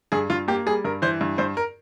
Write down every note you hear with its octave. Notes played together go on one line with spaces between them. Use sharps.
G2 G#4
G2 F4
A#3 G4
G3 G#4
G2 A#4
E3 C5
G2
G2 C5
A#4